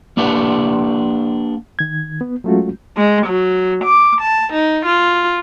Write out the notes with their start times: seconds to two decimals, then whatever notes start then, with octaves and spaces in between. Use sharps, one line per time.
0.17 A#3 D4 G4 B4 F#5
1.79 D#3 G#6
2.21 B3
2.44 F#3 G#3 A3 C#4 F4 F#4
2.97 G#3
3.26 F#3
3.84 D6
4.21 A5
4.53 D#4
4.86 F4